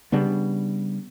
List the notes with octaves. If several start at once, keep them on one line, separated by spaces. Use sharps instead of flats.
C#3 G3 B3 D4